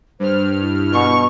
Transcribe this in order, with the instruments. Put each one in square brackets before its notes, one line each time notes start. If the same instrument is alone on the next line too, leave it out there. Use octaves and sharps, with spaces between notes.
[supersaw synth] G2 F6 [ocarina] C5
[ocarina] E4
[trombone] B2 [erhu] C#6